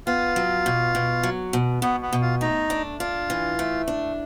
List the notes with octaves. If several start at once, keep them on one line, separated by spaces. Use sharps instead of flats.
B3 F4
F#3
B2
B2
F#3
B2
B2 B3
B3
B2
F4
A3 D#4
D4
D4 F4
E3
A3
D4